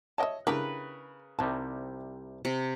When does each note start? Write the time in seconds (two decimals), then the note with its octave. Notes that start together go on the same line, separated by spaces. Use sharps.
0.18 C#5 D#5 E5 G5 A5
0.47 C#3 D4 E4 G4 A#4 B4
1.39 C2 C3 D#3 G3 A5
2.45 C3